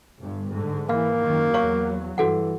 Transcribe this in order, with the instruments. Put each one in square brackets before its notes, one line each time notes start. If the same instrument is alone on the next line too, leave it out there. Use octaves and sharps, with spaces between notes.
[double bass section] G1 G2
G#2 D3
[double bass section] E3 [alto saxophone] A#3 [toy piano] F5
[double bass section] F#2 D#3
[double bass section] E2 F#3 [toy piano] C#5 F5 C#6
[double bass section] G2 [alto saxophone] E3 [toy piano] F#4 A4 F#5